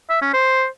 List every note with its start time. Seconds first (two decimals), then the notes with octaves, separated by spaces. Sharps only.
0.10 E5
0.21 C#4
0.33 C5